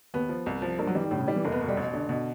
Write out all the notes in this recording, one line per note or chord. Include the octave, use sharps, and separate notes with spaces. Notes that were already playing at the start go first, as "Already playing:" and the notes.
D#2 B3
F3
C2
F3
G2 A#3
F#3
E3 G3
D#3
A2 D3
C#3
D#3 G3
E3
F1 A#3
B3
B2 A#3
G3
A1
D3
B2